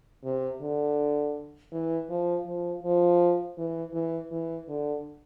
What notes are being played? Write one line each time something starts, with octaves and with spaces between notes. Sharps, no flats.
C3
D3
E3
F3
F3
F3
E3
E3
E3
D3